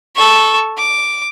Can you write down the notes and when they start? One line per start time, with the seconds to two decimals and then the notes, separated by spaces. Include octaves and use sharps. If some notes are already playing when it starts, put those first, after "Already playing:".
0.16 A4 C#6
0.78 D6